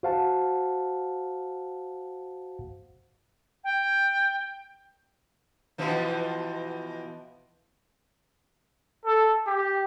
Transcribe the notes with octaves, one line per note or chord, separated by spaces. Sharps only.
F#4 C5 F5 F#5 A5
G5
B2 E3 F3
A4
G4